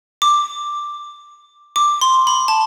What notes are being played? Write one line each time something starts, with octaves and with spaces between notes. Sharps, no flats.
D6
D6
C6
B5
A5